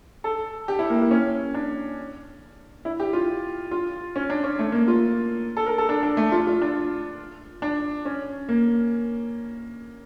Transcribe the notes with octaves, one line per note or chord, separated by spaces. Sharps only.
A4
G4
E4
A#3
A#3
C#4
D4
E4
G4
F4
F4
C#4
D4
C#4
A3
A#3
F4
A4
A#4
A4
D4
D4
A3
F4
F4
D4
D4
C#4
A#3